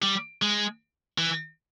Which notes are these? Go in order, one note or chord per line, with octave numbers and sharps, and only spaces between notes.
G3
G#3
E3